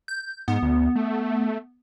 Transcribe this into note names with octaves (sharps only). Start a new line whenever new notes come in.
G6
G#2 B3
D2
A3